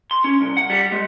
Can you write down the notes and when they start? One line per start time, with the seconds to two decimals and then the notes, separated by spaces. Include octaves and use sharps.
0.11 C6
0.24 C#4
0.41 C2
0.57 F#5
0.70 G3
0.92 G#3